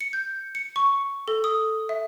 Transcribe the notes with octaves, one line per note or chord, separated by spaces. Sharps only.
C#7
G6
C#7
C#6
A4
D#6
E5